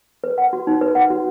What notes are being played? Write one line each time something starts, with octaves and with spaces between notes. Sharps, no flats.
B4
F#5
F#4
D#4
B4
F#5
F#4